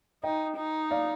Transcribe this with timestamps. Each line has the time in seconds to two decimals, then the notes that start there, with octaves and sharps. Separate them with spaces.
0.23 D#4 D#5 G5
0.57 D#4
0.91 D5 F5